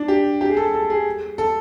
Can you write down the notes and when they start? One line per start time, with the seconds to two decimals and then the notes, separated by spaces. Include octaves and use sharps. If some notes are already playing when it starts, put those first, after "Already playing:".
Already playing: D4
0.08 G4
0.41 G4
0.49 G#4
0.57 A4
0.74 A4
0.90 G#4
1.38 A4